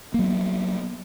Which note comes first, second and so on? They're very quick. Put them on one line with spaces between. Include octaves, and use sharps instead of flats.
A#3 F#3 B3